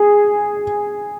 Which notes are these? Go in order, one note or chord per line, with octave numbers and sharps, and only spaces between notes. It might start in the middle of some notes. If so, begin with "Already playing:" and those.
Already playing: G#4